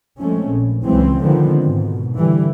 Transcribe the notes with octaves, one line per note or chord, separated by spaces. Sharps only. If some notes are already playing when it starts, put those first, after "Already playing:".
F3 G#3 A3 C4 C#4
A#1
C#2 C#3 E3 F#3 G#3 C4
D3 D#3 F3 G#3 B3 C4
G#2 B2
D3 E3 G3